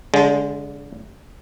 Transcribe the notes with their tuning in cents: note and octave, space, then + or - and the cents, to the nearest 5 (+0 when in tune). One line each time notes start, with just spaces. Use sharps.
D3 -35 G#3 +0